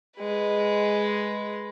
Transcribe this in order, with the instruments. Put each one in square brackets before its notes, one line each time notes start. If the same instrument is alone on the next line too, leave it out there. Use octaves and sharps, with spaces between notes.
[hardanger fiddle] G#3 B4